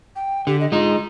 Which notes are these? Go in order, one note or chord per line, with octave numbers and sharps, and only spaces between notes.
G5
D3 G4
D#5
G#3 D#4 F4